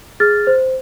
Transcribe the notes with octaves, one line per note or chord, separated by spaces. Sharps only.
G#4 F6 A6
C5